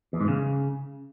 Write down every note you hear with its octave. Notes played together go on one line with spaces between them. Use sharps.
E2
G#2
C#3